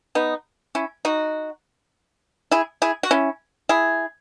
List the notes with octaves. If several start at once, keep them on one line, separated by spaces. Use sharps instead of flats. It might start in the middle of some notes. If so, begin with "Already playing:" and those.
B3 D#4
C#4 E4
D#4 F#4
E4 G#4
E4 G#4
F#4
C#4 E4
E4 G#4